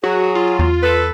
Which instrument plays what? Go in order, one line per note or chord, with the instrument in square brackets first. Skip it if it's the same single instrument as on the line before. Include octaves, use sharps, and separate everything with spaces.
[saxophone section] F#3 G#4 [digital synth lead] F#4
[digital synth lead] F4
[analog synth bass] E2
[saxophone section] A4 B4